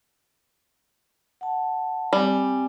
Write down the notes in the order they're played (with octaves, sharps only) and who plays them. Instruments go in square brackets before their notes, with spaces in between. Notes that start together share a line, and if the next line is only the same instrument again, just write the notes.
[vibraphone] F#5 A5
[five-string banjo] G3 [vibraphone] C4 G#5